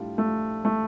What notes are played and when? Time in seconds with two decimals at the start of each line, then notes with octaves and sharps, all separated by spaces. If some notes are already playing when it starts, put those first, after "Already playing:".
Already playing: A2 G3 D4 F4
0.18 A3
0.65 A3